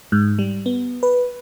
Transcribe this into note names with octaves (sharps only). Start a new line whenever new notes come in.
G#2
G3
B3
B4